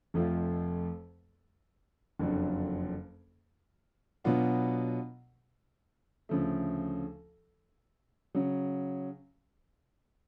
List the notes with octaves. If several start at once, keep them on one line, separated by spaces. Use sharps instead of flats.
F1 F2 F3 A3 F4
F#1 F2 D3 F#3
B2 F#3 B3 D4 F4
D2 C#3 F3 A3
C#3 F#3 C#4